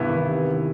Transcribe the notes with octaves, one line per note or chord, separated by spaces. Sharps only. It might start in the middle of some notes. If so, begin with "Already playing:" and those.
Already playing: G2 C3 E3 B3 E4
D#3
C3